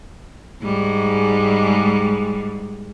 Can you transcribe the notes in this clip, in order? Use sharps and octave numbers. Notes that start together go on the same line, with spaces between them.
G#2 G3 G#3